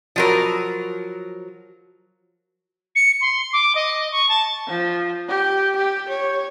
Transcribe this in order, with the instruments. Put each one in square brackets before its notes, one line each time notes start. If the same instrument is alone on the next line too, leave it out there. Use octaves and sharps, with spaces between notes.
[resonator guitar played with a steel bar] F3 F#3 A#4
[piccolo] C#7
C6
D6
D#5
C#6
A5
[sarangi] F3
G4
G4
C#5